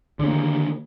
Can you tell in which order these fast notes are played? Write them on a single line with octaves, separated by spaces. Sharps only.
D3 C#4 A#3 D#3